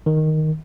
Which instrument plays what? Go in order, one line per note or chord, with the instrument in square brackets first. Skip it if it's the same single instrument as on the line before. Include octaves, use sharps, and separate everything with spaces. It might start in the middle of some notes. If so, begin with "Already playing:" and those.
[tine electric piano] D#3